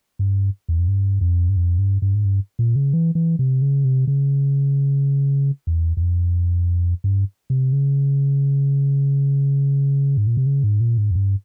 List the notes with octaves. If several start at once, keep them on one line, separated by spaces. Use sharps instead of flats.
G2
E2
F2
G2
F2
G2
F2
G2
G2
G#2
G2
A#2
C#3
E3
E3
C3
C#3
C3
C#3
E2
E2
F2
G2
C3
C#3
G#2
A#2
C3
C#3
G#2
A#2
G#2
F2
G2